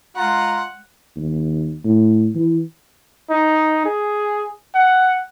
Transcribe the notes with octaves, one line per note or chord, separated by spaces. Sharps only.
G#3 F4 F#5 A#5
D#2
A2
E3
D#4
G#4
F#5